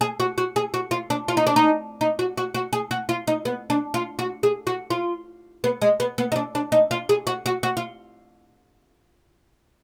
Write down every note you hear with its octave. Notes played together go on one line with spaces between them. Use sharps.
G#4
F#4
F#4
G#4
F#4
F4
D4
F4
D#4
D4
D#4
D#4
F#4
F#4
F#4
G#4
F#4
F4
D#4
B3
D4
F4
F#4
G#4
F#4
F4
B3
G#3
B3
B3
D#4
D4
D4
D#4
F4
G#4
F#4
F#4
F#4
F4